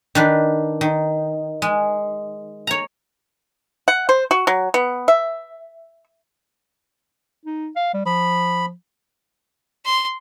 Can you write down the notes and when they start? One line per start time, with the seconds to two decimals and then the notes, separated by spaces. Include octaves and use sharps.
0.15 D#3 D4 B4
0.81 D#3
1.62 G#3
2.67 C#5 A#5
3.88 F#5
4.09 C5
4.31 F#4
4.47 F#3
4.74 B3
5.08 E5
7.45 D#4
7.76 F5
7.94 G3
8.06 F3 B5
9.85 C6